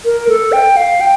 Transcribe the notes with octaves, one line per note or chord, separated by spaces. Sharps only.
A#4
A4
G5
F5
G5